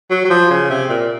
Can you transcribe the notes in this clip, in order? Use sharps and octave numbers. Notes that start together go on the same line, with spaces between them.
F#3
F#3
F3
C#3
C3
A#2